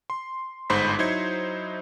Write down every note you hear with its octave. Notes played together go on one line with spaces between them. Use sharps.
C6
G1 G#2 C5 B5 G6 B6
F#3 D#4 E4 C5 G#6 C#7